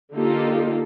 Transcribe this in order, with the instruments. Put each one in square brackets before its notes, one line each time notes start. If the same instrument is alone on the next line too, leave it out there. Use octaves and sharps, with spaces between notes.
[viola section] D3 A#3 D#4 F4 G4 A4